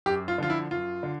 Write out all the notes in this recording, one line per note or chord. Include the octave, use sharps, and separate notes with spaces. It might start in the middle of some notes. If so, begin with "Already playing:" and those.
F#2 G4
F4
D3 F3 F4
E4
F#2 F4
D3